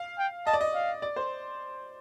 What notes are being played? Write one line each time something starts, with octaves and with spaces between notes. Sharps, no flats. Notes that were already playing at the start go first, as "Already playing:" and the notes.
Already playing: F5
G5
D#5 A5
D5
D#5
F5
D5
C5